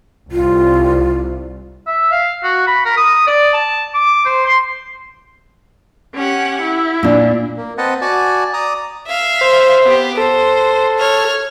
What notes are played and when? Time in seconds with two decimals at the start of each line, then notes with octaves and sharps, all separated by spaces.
0.32 C2 F4
1.87 E5
2.12 F5
2.43 F#4
2.67 B5
2.85 A#4
2.97 D#6
3.27 D5
3.54 A5
3.94 D6
4.25 C5
4.45 C6
6.14 C#4 G4 F#5
6.62 E4
7.03 A#2 D4
7.57 A#3
7.78 C4 B4 D#5 F#5 A5
8.01 F#4 D5 G#5 A5
8.53 D5 A#5 D#6
9.07 E5 F5
9.41 C5
9.83 B3 G4
10.17 A4 C5
10.98 C#5 F6